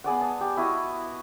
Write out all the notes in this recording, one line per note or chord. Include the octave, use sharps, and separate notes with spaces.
B3 G#4 D5 F#5
A5
G4
E4 F#4 D#5